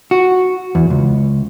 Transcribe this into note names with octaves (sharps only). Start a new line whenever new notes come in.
F#4
E2
C#2